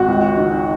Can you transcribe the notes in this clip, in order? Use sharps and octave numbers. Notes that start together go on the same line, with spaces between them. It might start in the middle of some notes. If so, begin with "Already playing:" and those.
Already playing: G#1 F#4
C#2
D#3